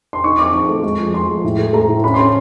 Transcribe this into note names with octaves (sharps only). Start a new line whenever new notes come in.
C6
D#4 C#6
C4 D6
D#4 C#6
A3
G#3
F3
F3 C6
G#3
A2
A3
A3 A#5
A2
C#4 B5
C#4 C6